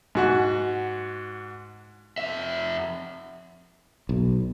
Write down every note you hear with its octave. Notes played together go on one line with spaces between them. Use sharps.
G#2 F#4 F#5
F2 E5
B1